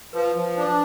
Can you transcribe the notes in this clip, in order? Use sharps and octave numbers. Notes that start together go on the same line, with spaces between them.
F3 B4
F3
D4